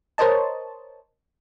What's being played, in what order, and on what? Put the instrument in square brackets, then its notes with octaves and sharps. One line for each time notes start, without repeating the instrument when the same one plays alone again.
[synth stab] A#4 C5 C#5 D#5 A5